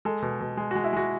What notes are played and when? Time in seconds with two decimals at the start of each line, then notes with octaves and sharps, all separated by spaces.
0.05 G#3 A4
0.22 B2
0.41 B2
0.57 G#3
0.71 G#3 F#4
0.84 E4
0.93 G#3 F#4